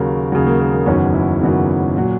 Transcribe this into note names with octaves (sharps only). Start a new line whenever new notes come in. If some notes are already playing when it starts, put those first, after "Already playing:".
Already playing: D#2 C#3 F#3 A#4
D#2 C#3 F#3 G#4
A#3
A#3
A#3
F#1 E2 D#3 F#3 C#4
E4
F#1 E2 D#3 F#3
A#2 F#3